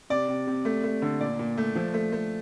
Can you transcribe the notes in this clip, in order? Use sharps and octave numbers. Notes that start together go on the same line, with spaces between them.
C3 D5
C3
C3
A3
A3
D3
A#2 D5
A#2
A3
F3
A3
A3